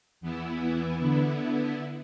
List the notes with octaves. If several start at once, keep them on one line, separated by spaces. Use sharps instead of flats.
E2 E3 B3 E4
D3 B3 E4